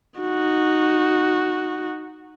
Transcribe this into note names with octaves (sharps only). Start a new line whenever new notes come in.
D#4 F#4